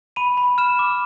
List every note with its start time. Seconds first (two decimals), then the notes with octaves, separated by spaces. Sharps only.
0.16 B5 D#7
0.37 B5
0.58 F6 E7
0.79 D6